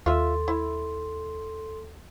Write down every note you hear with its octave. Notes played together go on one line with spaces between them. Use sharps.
D#2 F4 A4 E5 C6
E4